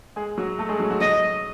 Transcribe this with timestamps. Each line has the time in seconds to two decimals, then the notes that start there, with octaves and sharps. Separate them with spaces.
0.16 G#3 G#4
0.38 F#3 F#4
0.59 A3 A4
0.69 G#3 G#4
0.80 F#3 F#4
0.91 F#3 F#4
1.01 F#3 F#4 D#5